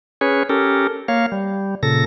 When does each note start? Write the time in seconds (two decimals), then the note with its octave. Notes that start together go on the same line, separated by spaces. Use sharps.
0.21 C#4 G#4 B4 C#5
0.49 C#4 G4 A4 A#4
1.08 A#3 C#5 F5
1.32 G3
1.83 A#2 C#3 A4 A#6